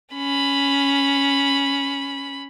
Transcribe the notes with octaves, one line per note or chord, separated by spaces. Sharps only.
C#4 B5